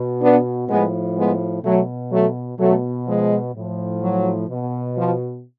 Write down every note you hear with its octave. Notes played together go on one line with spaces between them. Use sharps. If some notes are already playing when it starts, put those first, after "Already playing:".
Already playing: B2
B3 D4
A2 F3 G#3 B3
G#3 B3
B2 F#3 A3
F#3 A3
B2 F#3 A3
F3 G#3
A2 F3
F#3
B2
F3